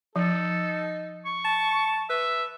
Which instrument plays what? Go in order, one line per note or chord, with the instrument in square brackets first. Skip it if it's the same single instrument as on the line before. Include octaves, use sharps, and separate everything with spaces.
[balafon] F3 [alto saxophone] D#4 [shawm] A4
[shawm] C#6
[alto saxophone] A5
[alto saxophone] B4 [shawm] E5